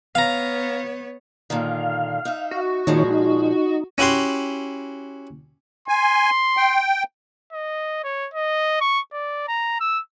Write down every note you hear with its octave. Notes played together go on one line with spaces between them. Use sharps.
B3 C#5 F5 A#5
A#2 D3 D#3 F5
D#4 E5
F#4
A#2 D#3 F3 G#3 D#4 C#5
D#4
C#4 E4 F#4 G4 C6
G#5 C6
G5
D#5
C#5
D#5
C#6
D5
A#5
E6